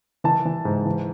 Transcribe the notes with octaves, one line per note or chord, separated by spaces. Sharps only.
E3 A5
E3
G#2
E3